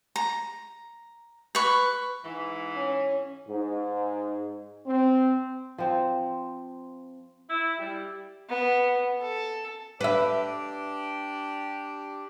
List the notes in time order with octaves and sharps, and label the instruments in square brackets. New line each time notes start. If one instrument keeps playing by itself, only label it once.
[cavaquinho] A#5
B4 C#6
[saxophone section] G#2 E3
[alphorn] C#4
[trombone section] G#2
C4
[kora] F3 C4
[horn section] E4
G3
[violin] B3
A4
[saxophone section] D4 G4 D5 [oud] B4 E5